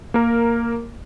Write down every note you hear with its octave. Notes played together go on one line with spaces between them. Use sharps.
A#3 A#4